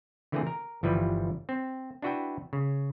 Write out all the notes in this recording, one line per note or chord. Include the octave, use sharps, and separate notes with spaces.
D3 E3 A3 A#3 C4 G#4
A#4
G1 E3 F3 G3 B4
C4
D4 E4 F#4 B4 E5 G5
C#3